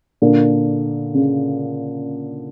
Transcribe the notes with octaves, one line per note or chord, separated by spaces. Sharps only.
A#2 D3
C#3